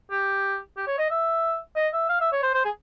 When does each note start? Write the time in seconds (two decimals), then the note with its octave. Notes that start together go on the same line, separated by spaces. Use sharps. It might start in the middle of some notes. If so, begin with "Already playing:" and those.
0.11 G4
0.77 G4
0.87 C#5
0.99 D#5
1.11 E5
1.76 D#5
1.93 E5
2.09 F5
2.21 E5
2.32 C#5
2.43 C5
2.54 C5
2.65 G#4